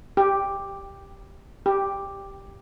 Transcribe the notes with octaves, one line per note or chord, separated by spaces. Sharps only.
G4
G4